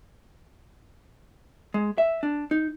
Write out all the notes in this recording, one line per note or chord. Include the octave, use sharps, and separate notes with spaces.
G#3
E5
D4
D#4